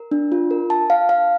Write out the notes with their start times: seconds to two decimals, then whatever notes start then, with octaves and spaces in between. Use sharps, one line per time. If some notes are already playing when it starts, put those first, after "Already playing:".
Already playing: A#4
0.11 D4
0.32 F4
0.51 A#4
0.70 A5
0.90 F5
1.09 F5